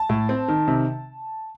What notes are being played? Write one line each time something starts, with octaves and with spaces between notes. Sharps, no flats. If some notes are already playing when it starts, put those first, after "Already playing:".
Already playing: A5
A2
C4
D#3
C3